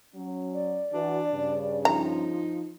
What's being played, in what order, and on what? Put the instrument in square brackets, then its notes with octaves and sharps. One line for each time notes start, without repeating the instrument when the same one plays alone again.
[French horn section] F#3 C#4
[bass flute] D5
[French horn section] E3 F#4 [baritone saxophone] D4
[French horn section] G2 C#3
[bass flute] F3 [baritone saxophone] D#4 [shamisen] A#5